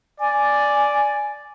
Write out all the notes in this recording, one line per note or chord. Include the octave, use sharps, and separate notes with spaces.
D5 G#5